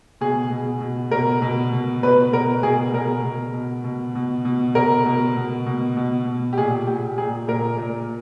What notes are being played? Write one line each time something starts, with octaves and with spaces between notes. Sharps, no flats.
B2 G#4
B2
B2
B2 A#4
B2
B2
B2 B4
B2 A#4
B2 G#4
B2 A#4
B2
B2
B2
B2
B2
B2 A#4
B2
B2
B2
B2
B2
G4
A#2 G#4
A#2 G4
A#2 G#4
A#2 A#4
A#2